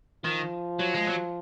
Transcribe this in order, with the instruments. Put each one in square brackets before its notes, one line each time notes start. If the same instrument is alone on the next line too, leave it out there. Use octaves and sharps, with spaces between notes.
[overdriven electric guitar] D#3 [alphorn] F3
[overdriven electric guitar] F#3
G#3
F#3